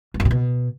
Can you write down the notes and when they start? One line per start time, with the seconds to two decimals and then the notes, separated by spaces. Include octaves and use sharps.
0.14 G2
0.20 F#2
0.25 C3
0.31 B2